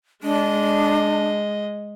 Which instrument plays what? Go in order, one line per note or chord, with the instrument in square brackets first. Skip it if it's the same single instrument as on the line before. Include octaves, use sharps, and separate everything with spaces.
[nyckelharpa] G#3 D#5 [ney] D4